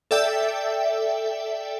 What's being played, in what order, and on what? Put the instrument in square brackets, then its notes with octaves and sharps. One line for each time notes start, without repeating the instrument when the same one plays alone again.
[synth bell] A4 D5 E5 G5